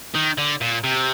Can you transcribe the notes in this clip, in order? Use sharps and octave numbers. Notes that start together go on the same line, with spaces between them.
D#3
D3
A#2
C3